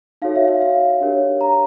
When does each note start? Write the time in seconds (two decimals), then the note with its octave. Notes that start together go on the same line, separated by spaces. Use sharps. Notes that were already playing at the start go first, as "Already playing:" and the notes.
0.22 D#4 F#4 A4 C#5 F5
0.36 E5
0.48 F5
0.62 F5
1.01 D4 G4 A#4 C#5
1.41 A#5